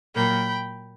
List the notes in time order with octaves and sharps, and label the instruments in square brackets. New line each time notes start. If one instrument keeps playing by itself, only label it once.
[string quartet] A#2 F#3 A#3 G5 B5